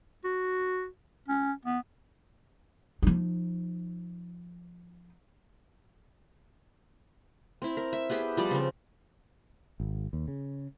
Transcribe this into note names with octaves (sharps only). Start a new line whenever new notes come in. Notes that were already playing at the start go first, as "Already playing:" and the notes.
F#4
C#4
B3
F3 D#4
C4 E4
A#4
E5
B3 G4 G#4 G5
F3 G3 D5
C#3 C4
G#1
D#2
C#3